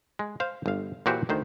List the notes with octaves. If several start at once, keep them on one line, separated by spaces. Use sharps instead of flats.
G#3
C5 F5
G1 F5
A#2 E3 F#4 G4 C5
D2 D#3 C5